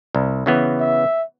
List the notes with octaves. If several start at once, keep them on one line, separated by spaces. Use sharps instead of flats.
C2
C#3 E3 B3
E5